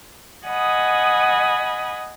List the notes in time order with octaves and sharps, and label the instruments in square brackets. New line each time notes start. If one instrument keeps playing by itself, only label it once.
[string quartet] D#5 F#5 G#5 B5 D#6